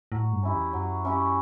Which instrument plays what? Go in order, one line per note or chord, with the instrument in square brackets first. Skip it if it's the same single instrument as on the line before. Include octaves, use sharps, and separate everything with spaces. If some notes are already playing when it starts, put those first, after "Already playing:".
[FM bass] A2 [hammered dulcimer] F#3
[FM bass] G2
[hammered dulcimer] C#4 E4 G4
[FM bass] E2
[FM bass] F#2 [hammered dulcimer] F#3
[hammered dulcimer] C#4 E4 G4